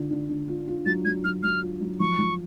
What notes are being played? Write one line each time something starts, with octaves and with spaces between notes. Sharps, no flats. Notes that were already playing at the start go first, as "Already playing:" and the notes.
Already playing: D3 F4
D3
D3
F4
F4
F#3 A6
F#3 G#6
F#3 F6
F#3 F6
F4
F#3
F3 C#6
F3